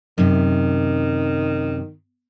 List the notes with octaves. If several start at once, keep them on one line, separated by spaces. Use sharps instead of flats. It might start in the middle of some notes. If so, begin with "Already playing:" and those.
F#2 C3 D#3